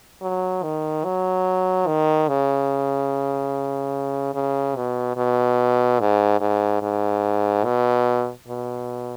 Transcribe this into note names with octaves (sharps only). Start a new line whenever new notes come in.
F#3
D#3
F#3
D#3
C#3
C#3
B2
B2
G#2
G#2
G#2
B2
B2